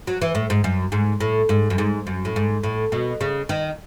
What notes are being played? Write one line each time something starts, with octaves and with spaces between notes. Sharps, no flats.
F#3
E3
A2
G#2
F#2
G#2
A2
G#2
F#2
G#2
F#2
A2
G#2
A2
B2
C#3
D#3